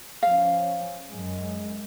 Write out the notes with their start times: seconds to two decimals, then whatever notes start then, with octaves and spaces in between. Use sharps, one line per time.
0.23 F3 C#4 F5
1.11 F#2 G#3